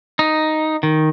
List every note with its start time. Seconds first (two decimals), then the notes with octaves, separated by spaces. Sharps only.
0.19 D#4
0.83 D#3